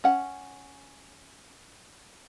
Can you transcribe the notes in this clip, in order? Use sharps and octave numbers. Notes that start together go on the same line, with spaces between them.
C#4 F#5